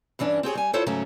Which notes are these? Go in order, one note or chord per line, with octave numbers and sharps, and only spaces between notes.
G2 E3 C#4 D4
C4 G4 G#4 C#5
G3 G#5
E4 F4 A4 C5 C#5
G#2 C#3 F#3 A3 C#4